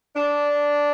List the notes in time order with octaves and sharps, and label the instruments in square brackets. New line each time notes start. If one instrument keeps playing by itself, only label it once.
[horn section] D4